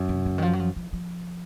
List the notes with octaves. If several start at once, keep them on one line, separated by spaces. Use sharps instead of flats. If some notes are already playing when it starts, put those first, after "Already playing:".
Already playing: F#2
C3
C#3
D#3
F3
F#3
F3
F3
F3